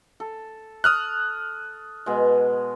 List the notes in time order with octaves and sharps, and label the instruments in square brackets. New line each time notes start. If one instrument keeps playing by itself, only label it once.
[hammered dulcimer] A4
[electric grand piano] D#6 F6 F#6
[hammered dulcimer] B2 G#3